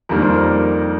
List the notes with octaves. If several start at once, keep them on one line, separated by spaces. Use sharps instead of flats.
F2 D#3 G3 A#3 D4 A#4
C5
A#4